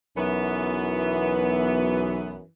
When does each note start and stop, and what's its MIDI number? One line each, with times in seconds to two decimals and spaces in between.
0.17 2.34 35
0.17 2.42 42
0.17 2.49 52
0.17 2.35 59